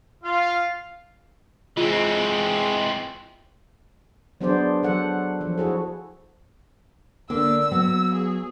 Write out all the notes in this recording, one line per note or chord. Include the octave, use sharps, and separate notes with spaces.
F4 F5
E3 G#3 C4 F4
F#3 B3 D4 G#4 C5 D5
F#3 A4 F#5
F3
E4 F#4 G#4 A4
D3 A#3 D4 E6
F#3 B3
G#4